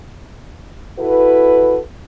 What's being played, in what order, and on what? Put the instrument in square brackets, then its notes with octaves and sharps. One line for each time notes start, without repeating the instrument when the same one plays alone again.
[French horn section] E4 F#4 A4 B4